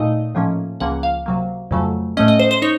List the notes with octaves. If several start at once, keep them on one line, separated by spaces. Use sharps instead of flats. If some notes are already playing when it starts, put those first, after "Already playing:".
Already playing: A#2 A3 D#4 D#5
A2 F3 A#3 C#4
C#2 C#3 F3 A#3 C#4 F#5
F5
C3 F#3 A#3
F2 C#3 F#3 A3
A2 A3 C#4 D#5
D#5
C5
C5
D#4 C#5